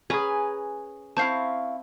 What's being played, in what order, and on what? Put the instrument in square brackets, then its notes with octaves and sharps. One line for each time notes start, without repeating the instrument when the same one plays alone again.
[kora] C#4 G#4 [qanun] B4 A#5 [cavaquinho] G#5
[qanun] C4 [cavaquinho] E4 F5 C#6 [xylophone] A5 G6 C7